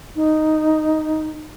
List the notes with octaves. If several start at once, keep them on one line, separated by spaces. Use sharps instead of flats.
D#4